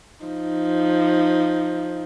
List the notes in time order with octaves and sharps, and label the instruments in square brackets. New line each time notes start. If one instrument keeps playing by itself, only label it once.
[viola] F3 D#4